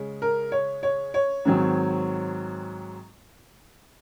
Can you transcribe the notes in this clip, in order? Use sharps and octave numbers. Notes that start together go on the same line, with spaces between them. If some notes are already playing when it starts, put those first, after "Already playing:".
Already playing: C#3 G#3 C#4
A#4
C#5
C#5
C#5
G#2 D#3 F#3 C4